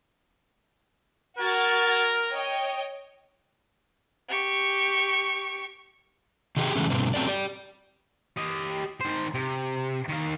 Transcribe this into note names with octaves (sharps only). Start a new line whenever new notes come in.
F#4 A#4 G#6 A6
C#5 D#5 G5
G4 C#6
C3 D#3 D#4 G4 G#4
C#3 E3 G#3 A3 C#4
G2 B2 D3 C4
F#3 C4 C#4 A4 D5
G4 D5
G4 D#5
D#3 C5
C3
D#3 F5